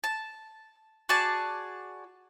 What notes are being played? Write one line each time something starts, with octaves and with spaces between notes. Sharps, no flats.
A5
F#4 G#4 D5 A5